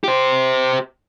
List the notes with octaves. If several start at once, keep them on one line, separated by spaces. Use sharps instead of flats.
G4 C5